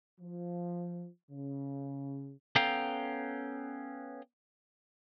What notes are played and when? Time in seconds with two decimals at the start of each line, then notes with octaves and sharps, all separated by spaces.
0.21 F3
1.31 C#3
2.56 B3 C#4 A4 F5 G5 A#5